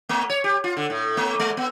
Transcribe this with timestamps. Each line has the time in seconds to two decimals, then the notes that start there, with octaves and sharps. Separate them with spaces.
0.09 A3
0.30 C#5
0.44 G4
0.64 F4
0.77 D3
0.90 A2
1.17 A3
1.40 G#3
1.57 B3